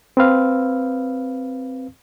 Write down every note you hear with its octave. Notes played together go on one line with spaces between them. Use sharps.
C4 B4 F5